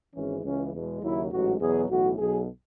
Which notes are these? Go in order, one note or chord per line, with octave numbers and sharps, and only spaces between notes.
G#1 G#2 E3 G#3 C#4
C#2 C#3 E3 G#3 C#4
E2 B2 G#3
D#2 C#3 F#3 E4
A1 G#2 F#3 F#4
E2 B2 F#3 G#4
B1 A2 E3 F#4
B1 B2 F#3 G#4